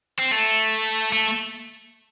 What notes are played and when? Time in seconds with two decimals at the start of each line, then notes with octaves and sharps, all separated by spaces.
0.19 C4
0.31 A3
1.12 A3